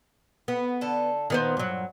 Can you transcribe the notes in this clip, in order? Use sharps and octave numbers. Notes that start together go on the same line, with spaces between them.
B3
D3 A4
A#2 D#3 B3 C5
G2 F#3